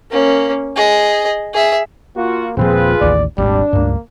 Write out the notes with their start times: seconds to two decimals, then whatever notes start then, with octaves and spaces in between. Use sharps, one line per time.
0.11 A#3 C#4
0.76 G#4 D#5
1.54 G#4 E5
2.17 A#3 F4 F#4
2.57 D#1 A#2 F3 C4 F4 G#4 B4
3.01 A1 D#2 D5
3.38 D#1 G#1 G3 D4
3.73 C#2 G2 A#3